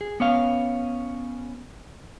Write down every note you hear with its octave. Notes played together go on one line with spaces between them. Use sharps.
G#4
B3 C#4 F5